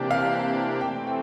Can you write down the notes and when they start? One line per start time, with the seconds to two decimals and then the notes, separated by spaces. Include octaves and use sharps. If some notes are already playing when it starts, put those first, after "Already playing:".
Already playing: C3 E3 A#3 D4 G4
0.11 F5
0.80 E3 A3 C4 G5
1.07 G5